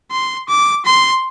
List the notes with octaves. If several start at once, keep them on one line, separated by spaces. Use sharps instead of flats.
C6
D6
C6